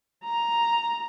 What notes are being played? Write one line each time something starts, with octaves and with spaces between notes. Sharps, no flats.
A#5